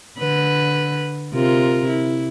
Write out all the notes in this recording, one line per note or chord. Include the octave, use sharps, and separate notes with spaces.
D3 B4
C3 F4 A#4
E4